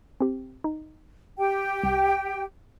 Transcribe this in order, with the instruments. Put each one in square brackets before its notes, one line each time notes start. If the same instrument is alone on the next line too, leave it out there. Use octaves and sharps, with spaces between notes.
[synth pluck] C4 G4
D#4
[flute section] G4 G5
[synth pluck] C2